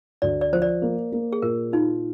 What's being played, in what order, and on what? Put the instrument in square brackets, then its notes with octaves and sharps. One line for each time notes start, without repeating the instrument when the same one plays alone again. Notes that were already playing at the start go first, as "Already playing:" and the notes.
[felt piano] D2 [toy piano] D5
[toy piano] D5
[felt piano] F3 [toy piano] C5
[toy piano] D5
[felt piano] A#3
A#3
[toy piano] G#4
[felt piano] A#2 [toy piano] A#4
[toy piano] D#4 [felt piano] F4